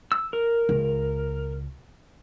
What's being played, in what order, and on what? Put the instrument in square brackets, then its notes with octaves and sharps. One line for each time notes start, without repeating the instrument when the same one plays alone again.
[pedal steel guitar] E6
A#4
[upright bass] C#2